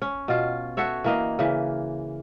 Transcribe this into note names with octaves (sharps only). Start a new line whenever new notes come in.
C#4
B2 F4
F#4 A4 C#5 E5
E3 A#3 D#5
C#3 E3